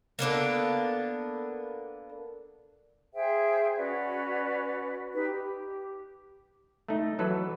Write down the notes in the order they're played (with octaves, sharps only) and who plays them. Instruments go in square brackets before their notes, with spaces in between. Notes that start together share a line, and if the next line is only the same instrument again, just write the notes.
[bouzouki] A#3 B3 D4 A4
[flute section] G#4 C5 E5 G5
C#4 F#4 B4 D5
D#4 G4 B4
G4
[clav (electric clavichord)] A3 D#4
E3 F#3 A4 B4